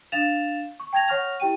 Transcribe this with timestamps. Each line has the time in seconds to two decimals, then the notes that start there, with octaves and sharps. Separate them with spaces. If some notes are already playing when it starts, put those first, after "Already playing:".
0.12 D4 F5 A6 E7 F7
0.80 C#6
0.93 G5 A5 G#6 A#6 F7
1.08 C#5 F#5 C#6 F6 A#6 F7
1.40 E4 G4 G5 D#7